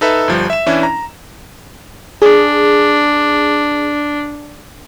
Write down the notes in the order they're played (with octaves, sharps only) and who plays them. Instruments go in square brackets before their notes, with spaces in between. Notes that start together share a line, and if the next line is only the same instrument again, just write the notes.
[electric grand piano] D#4 A4 B4 E5
G1 F3 G3
E5 E7
E3 C#4 D4 E4
A#5
[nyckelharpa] D4 [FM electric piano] G#4